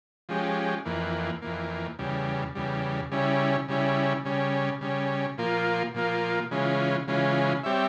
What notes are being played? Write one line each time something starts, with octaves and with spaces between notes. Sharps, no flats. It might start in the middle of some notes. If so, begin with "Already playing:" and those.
F3 G#3 C#4 G4
F2 E3 A#3
F2 E3 A#3
E2 C#3 G3
E2 C#3 G3
C#3 G3 C#4 E4
C#3 G3 C#4 E4
C#3 G3 C#4
C#3 G3 C#4
A#2 F3 A#3 F4 A#4
A#2 F3 A#3 F4 A#4
C#3 E3 G#3 C#4 F4
C#3 E3 G#3 C#4 F4
G3 C4 G4 C#5 E5